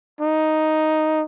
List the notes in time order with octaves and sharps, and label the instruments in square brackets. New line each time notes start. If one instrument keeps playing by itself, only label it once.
[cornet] D#4